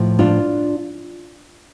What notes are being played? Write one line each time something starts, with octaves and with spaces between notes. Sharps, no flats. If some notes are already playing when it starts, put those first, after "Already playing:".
Already playing: A2 F3
D4 F4